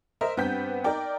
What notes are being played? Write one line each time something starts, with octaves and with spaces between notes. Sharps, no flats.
A#4 C5 D#5 E5 A#5
G2 B3 C4 G5 G6 B6
D#4 A#4 D5 G5